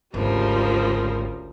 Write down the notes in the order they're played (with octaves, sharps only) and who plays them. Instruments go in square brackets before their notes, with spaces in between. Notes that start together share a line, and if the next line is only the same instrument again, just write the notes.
[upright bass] G#1 [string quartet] D2 C#3 A#4 [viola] F3 G3